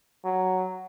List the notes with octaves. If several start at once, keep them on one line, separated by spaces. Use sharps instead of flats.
F#3